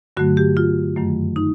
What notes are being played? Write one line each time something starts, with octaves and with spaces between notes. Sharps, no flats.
G2 D3 F#3 A3 F#4
G4
F4
F#2 D#3 F#3 A3
D#4